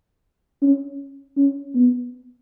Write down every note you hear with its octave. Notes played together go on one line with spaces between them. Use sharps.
C#4
C#4
B3